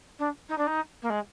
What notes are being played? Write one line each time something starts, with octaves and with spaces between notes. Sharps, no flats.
D4
D#4
D4
D#4
A#3
G#3